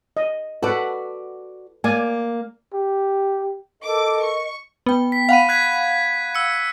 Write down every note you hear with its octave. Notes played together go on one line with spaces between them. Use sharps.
D#5
F#4 A4 B4 D5 F#5
A#3 D5 G#5
G4
A4 A#4 D#5 D6
C#6
B3 G5
B6
F5 F#5 B5 B6 D#7
F#6 G#6 B6
E6 C#7